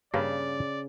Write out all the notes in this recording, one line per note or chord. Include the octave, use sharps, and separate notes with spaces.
G2 C#3 A#3 D5